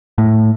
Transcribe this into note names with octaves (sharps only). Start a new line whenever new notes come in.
A2